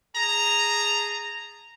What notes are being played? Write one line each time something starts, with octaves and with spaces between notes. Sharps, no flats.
G#4 A5 A#5